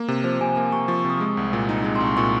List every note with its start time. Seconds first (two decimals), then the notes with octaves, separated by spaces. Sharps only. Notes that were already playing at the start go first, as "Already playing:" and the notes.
Already playing: A#3
0.08 C3
0.24 F3 C5
0.41 C3 G#5
0.56 A#3 A#5
0.72 C3 C#6
0.88 F3 C#6
0.99 C#6
1.04 C3
1.10 D#6
1.20 G#3 C#6
1.37 C2
1.53 A#2
1.69 D#4
1.84 G#3 A#5
1.95 C6
2.00 C2
2.06 C#6
2.17 A#2 C#6